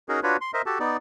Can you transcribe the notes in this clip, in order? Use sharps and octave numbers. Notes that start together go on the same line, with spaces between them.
C#4 D#4 F#4 G#4 A#4
D4 F4 F#4 B4 C#5
C6
A#4 C5 D#5 E5
F#4 G4 A4 A5
B3 D#4 D5